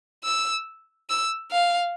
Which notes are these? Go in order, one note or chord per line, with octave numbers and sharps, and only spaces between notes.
E6
E6
F5